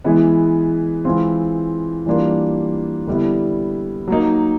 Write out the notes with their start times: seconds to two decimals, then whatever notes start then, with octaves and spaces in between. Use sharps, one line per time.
0.04 E3 G#3 B3 E4
1.05 E3 G#3 C4 F4
2.06 E3 G3 A#3 D4 F4
3.07 D3 G3 B3 E4
4.08 F#3 A#3 D#4